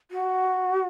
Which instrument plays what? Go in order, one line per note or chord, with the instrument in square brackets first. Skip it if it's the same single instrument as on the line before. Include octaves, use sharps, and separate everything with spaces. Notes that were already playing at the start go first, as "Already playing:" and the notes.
[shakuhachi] F#4